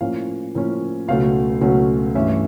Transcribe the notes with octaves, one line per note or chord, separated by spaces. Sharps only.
A2 F3 A#3 C#4 F5
A2 F3 A#3 C#4
C#2 B2 F#3 A3 C#4 F5
C#2 B2 F#3 A3 C#4
G2 E3 A3 C#4 E5